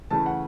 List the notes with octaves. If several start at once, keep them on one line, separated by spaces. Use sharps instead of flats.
C#3 E3 A3 A5
F#5